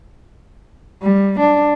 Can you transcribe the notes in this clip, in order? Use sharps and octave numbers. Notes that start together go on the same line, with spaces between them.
G3
D4